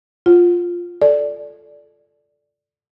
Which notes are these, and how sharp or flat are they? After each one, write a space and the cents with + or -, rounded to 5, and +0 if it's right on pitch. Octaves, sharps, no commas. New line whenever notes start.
F4 +0 F#5 -5
A4 +0 D5 +0